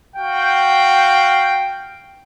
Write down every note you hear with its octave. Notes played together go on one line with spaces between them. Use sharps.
F#4 F5 G5